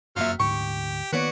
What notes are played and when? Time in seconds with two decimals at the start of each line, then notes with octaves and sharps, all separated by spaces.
0.16 F1 F#2 F#3 A#3 F4 E5 F6
0.40 D2 G#2 G4 C#6
1.12 D#3 A#3 B3 F#4 B4 C#5 D5